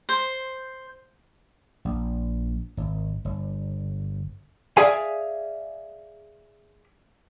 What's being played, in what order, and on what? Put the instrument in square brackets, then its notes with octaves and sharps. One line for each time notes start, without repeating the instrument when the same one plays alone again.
[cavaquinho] C5
[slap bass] A#1
G#1
G1
[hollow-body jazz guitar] G#4 D5 E5 F5 G#5